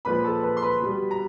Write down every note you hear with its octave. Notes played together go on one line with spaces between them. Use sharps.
A#2 F3 G#3 B4 B5
A4 A5
B4 B5
C6
B4 B5
B2 G3
A#5